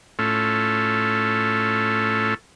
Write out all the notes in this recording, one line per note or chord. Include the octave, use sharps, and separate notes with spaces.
A2 A3 C#4 F4 A4